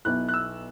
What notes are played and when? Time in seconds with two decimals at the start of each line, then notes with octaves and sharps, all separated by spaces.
0.05 B1 B2 B3 E4 F#6
0.29 F#6
0.34 E6